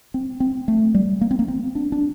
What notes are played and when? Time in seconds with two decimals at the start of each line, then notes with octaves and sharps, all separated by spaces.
0.14 C4
0.40 C4
0.68 A3
0.94 G3
1.21 A#3
1.31 C4
1.39 A#3
1.48 C4
1.75 D4
1.92 D4